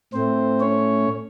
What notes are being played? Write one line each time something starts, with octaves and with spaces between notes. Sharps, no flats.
A2 A3 C4 C5
C#4 C#5